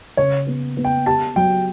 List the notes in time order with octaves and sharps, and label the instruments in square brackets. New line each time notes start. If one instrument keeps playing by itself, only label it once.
[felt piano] C#3 [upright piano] C#5
[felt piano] B3
B3
[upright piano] G5
[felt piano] G4 [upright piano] A5
[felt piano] F#3 [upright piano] G5